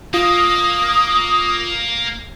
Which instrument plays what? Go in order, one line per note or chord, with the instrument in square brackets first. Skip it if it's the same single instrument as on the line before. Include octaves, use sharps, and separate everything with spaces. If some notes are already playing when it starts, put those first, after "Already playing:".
[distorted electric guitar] A#3 [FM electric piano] F4 [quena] D#6